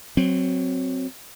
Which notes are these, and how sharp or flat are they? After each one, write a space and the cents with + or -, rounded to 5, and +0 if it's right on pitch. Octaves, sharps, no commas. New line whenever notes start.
F#3 +0 C4 +0